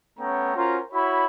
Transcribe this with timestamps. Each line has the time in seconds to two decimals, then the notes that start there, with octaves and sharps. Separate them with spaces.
0.19 A3 B3 C#4 C#5 G5 A#5
0.56 C#4 F4 F#4 A#4 C5 A#5
0.92 E4 F#4 C#5 B5